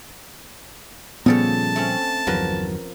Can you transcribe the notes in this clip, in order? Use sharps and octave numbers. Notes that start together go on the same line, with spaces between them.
A#2 C#3 F3 G3 B3 A4 C#5 A5
A3 C4 C#4
G1 E2 F3 F#3 A#4 B4